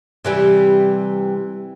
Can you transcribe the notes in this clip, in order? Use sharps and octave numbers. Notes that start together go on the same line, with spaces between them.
C3 E3 G3